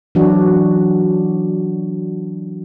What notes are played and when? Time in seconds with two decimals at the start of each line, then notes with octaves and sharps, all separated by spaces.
0.15 E3 F#3 D4 F#4